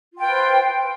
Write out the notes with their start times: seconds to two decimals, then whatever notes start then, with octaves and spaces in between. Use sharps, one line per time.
0.14 F4
0.18 G5
0.23 B4
0.27 C5